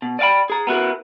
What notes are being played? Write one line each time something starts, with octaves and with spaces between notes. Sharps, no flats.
B2
D5 D#5 F5 G5 B5
G#4 A#5
B3 E4 F#4 A#4